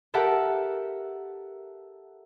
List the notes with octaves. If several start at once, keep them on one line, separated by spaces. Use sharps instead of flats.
G4 A4 A#4 E5 F#5 A5